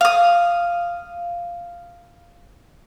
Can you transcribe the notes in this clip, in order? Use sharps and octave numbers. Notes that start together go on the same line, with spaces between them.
F5 D#6